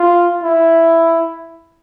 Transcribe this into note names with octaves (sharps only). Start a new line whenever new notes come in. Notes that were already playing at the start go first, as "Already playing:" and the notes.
Already playing: F4
E4